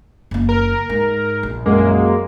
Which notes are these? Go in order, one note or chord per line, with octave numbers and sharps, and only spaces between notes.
F#1 A#3
A#4
G#2
A#1
F#2 G#3 A#3